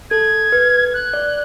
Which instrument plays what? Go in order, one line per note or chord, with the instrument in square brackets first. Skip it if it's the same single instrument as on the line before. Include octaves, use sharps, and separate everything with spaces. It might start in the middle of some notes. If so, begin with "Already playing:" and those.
[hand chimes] A4 [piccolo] G#6
[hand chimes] B4
[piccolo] F#6
[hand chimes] D5